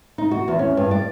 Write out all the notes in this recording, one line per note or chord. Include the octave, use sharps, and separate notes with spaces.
D#4
F#4
E2
C#4
G2
D5